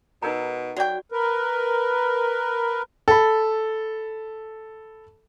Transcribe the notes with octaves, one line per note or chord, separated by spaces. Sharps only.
B2 D#4 A#4 A#5
F#3 F#4 D5 G5 C#6
A#4 B4
A4 B5